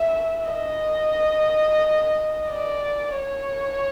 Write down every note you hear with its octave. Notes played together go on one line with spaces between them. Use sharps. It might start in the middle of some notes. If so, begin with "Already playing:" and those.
Already playing: E5
D#5
D5
C#5